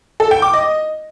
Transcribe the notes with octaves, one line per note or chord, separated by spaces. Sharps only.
A4
G5
D6
D#5